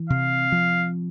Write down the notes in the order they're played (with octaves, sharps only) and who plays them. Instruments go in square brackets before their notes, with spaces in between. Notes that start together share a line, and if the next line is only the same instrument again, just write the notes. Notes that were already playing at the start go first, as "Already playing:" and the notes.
Already playing: [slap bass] E3
[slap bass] C3 [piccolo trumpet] F5
[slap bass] F3